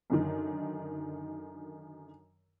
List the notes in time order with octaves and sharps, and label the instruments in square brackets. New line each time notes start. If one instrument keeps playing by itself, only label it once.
[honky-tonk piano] F#2 D3 D#3